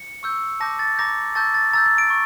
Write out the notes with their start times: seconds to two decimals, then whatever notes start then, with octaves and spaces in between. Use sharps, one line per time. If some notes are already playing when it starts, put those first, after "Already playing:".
Already playing: C#7
0.23 C#6 E6 G6
0.60 A5 D6 G6 A#6
0.79 A6
0.98 A#5 D6 G6 A#6
1.35 A5 C#6 E6 G6 A6
1.54 A6
1.73 A#5 E6 G6 A6
1.86 A6
1.98 D7
2.10 C#6